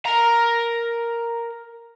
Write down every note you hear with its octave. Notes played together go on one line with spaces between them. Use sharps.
A#4 A#5